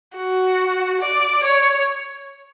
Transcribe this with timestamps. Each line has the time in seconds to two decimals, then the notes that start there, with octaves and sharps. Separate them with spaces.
0.16 F#4
1.01 D5
1.43 C#5